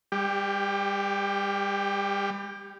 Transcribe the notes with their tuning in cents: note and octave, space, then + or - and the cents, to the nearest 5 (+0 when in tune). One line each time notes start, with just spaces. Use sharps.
G3 +35 G4 +0